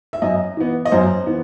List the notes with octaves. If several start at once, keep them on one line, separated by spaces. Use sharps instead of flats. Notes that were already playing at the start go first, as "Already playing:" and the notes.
E5
F#2 D#5
E3 B3
D#5
F#2 C5
E3 B3